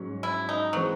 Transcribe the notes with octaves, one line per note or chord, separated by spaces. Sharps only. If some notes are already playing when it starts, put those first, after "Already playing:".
Already playing: G#2 F#3 C#4
E4
D#4
E3 F#3 G#3 C4